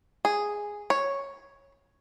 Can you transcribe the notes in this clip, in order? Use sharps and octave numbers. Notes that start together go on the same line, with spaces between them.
G#4
C#5